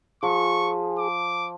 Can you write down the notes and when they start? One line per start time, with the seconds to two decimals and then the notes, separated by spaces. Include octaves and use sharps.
0.23 F3 G#4 C#6
0.99 D6